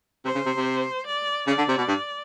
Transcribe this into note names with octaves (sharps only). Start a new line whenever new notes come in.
C3 C5
C#3
C3
C3
D5
C#3 D5
D3
C3
B2
G2